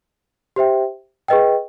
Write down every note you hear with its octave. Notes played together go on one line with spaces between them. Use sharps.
G4 C5 E5 G5
G#4 B4 D#5 G5